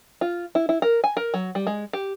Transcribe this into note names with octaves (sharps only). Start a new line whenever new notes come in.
F4
E4
E4
A#4
G#5
A#4
F#3
G3
G#3
G4